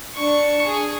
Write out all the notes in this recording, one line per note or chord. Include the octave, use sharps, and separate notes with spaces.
D4 C#6
G#4